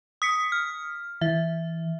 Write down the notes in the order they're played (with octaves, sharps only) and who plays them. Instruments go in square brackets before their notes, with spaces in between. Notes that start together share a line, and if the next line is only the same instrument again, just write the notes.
[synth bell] D#6 B6 C#7
F6
[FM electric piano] E3 [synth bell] E5